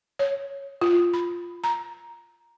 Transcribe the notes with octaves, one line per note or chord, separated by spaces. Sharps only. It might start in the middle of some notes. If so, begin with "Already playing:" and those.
C#5
F4
B5
A#5